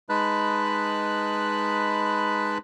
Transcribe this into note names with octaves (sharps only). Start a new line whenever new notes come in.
G#3 D#4 B4 A5 B5 F#6